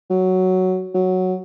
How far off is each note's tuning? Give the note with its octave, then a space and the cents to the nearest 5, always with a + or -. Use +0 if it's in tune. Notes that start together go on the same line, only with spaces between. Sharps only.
F#3 +5
F#3 +0